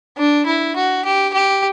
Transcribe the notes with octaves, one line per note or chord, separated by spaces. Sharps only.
D4
E4
F#4
G4
G4